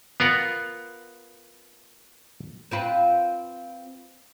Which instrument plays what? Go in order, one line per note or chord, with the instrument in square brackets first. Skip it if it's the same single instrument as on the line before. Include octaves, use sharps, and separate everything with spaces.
[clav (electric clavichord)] B3 F4 A#4 F#5
[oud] C4 F4 B4